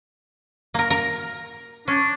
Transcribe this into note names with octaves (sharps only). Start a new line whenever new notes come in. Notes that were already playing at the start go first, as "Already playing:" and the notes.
A#3 A#4
A#4
C#4 D4